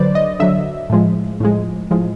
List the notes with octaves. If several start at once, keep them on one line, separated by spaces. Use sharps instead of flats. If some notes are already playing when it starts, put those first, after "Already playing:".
Already playing: D3 F#3 B4 C5 D5
D#5
D3 F#3 E5
A2 F3 G#3
A2 F3 G#3
A2 F3 G#3